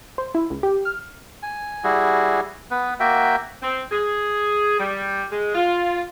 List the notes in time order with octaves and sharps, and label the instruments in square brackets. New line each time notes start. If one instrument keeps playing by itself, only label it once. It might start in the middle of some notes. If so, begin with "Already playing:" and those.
[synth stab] C5
E4
C#2
G4
F6
[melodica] G#5
G3 E4 F#4 G#4
B3 B4
A#3 F#4 E5 G5
[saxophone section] C4
G#4
G3
G#3
F4